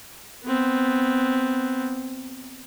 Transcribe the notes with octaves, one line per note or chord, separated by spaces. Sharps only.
B3 C4